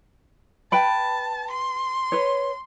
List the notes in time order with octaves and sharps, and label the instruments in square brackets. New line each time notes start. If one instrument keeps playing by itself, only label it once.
[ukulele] B4 G5 B5 [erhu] A5
[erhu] C6
[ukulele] B4 C#5